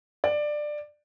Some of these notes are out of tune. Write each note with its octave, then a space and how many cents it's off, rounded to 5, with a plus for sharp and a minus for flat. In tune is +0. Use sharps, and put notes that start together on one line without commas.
D5 +15